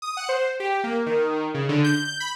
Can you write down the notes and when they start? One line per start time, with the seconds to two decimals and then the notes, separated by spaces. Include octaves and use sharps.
0.02 D#6
0.17 F#5
0.29 C5
0.60 G4
0.84 A#3
1.06 D#3
1.54 C#3
1.69 D3
1.84 G6
2.20 B5